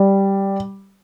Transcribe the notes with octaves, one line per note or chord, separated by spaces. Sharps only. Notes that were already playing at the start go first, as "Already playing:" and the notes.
Already playing: G3